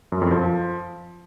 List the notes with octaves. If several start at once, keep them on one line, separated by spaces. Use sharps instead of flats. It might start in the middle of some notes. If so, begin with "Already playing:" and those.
F#2
F2
F3